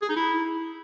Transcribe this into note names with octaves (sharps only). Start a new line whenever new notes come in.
G#4
D#4
E4